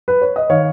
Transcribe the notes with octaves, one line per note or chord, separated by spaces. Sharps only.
B4
C#5
D#5
D#3 C#5 F5